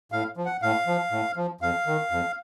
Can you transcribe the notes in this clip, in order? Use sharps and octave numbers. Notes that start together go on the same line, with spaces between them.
A2 F5
F3
F#5
A2 F5
F3
A2
F3
F2 F5
D#3
F2